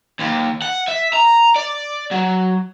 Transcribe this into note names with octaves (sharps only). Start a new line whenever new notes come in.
D#2
F#5
E5
A#5
D5
F#3